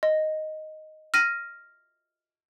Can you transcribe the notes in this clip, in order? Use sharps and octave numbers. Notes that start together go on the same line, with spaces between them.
D#5
F6 A#6 D#7